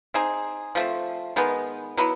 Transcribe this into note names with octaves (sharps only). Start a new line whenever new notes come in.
C4 D#4 G#4
F3 A3 C4
D#3 G#3 B3
F#3 B3 E4